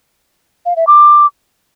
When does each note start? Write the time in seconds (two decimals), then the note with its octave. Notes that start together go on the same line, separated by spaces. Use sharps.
0.66 F5
0.76 E5
0.87 D6